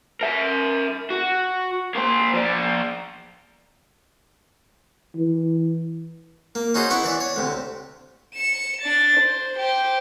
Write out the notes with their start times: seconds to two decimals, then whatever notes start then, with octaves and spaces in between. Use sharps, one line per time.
0.21 A#4 E5
1.10 F#4
1.95 A#3 C5
2.34 F3 D5
5.16 E3
6.55 A#3
6.74 C#4 D#4 F#4 G#4 C5
6.90 B3 E4 F#5 C#6
7.04 E3 D5
7.20 C#5
7.36 D2 C3
8.35 C#7 E7
8.82 D4 A6
9.20 C5
9.59 G4 C5